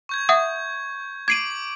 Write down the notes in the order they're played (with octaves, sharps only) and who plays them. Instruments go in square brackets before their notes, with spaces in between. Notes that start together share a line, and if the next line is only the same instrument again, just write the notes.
[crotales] C#6 G6 G#6
[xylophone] E5 F#5 D#6
[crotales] D6 D7 F#7 [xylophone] G#6 C7 D#7